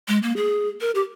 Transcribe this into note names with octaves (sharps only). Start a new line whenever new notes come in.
G#3
A#3
G#4
A#4
G4